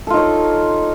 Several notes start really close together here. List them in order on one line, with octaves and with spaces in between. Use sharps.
A4 F4 D#4 C#5